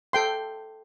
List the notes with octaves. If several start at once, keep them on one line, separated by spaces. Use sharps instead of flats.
A4 G5 C6